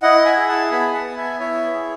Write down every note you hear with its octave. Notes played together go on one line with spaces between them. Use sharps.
E4 D#5 F#5
E5 G#5
G#4
F#5 A5
B3 G#5 B5
F#5 A5
B3
E5 G#5
E4 C#5 E5
G#4